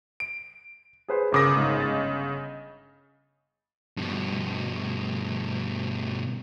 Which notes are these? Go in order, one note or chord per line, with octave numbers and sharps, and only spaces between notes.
D7
G#4 B4 C5
G1 C#3 A#4 D6 D#6 A#6
G#2
D#5 A6
G2 B2